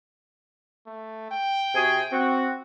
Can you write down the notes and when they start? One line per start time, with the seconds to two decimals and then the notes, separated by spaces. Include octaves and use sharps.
0.87 A3
1.31 G5
1.74 C3 F#4 G#4
2.12 C4 F#4